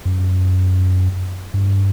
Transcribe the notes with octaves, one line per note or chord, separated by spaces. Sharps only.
F#2
G2